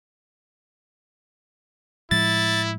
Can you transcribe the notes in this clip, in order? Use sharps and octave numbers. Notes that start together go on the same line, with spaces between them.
A2 F3 G#3 E4 A6